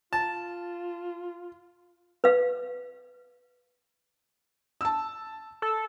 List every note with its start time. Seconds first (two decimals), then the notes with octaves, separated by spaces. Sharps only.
0.13 F4 A5
2.24 B4 F5
4.81 A5 E6
5.62 A4